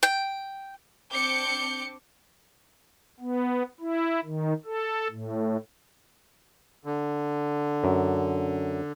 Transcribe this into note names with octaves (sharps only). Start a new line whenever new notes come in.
G5
C4 D4 D6 G6 C#7
B3
E4
D#3
A4
A2
D3
F#2